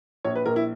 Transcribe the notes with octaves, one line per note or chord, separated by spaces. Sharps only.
A#1 C#5
B4
A#1 A#4
E4